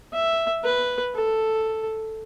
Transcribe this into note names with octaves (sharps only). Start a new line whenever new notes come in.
E5
B4
A4